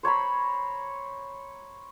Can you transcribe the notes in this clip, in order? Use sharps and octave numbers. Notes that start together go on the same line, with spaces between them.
C5 C#5 A#5 B5